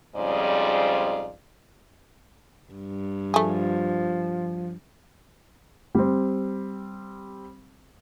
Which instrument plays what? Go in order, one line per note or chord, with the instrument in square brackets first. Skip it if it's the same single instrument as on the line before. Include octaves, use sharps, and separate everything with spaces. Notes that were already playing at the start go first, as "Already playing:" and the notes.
[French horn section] F2 G#2 C#3 G3 F4 D5
[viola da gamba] G2
[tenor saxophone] F3 [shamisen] A3 G#4
[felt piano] G3 C4